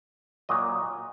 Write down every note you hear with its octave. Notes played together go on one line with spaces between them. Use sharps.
A#2 F#3 D#5